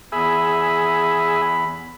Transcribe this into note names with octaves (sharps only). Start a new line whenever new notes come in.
E2 G#4 E5 B5